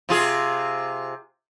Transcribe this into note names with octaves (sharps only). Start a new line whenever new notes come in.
C3 F4 G#4